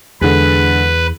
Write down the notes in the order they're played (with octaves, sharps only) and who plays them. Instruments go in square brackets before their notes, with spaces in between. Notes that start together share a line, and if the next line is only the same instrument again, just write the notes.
[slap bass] E2 [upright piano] D3 G#3 [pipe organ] B4